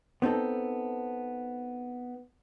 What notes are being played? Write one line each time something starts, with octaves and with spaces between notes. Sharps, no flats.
B3 C4 D#4 A4